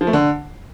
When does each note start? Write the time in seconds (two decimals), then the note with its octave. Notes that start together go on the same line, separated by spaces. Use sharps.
0.01 F3
0.07 A3
0.13 D3